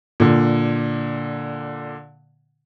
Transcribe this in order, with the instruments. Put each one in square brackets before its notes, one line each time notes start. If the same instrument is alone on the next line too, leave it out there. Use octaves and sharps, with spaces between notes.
[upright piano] A#2 D3